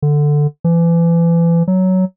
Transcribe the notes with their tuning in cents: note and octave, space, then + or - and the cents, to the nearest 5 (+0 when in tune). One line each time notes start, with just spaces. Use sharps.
D3 +5
E3 +35
F#3 +10